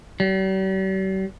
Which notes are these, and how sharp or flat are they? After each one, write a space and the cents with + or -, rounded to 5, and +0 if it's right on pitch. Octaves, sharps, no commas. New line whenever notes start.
G3 -45